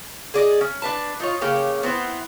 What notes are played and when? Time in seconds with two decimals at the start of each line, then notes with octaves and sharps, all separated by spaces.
0.34 G#4 D5 D#5
0.61 C#4
0.82 D4 B4 A5
1.20 D#4 F4 C#5
1.41 C#3 A#3 C#4 G4
1.83 B3 C4 E4 C5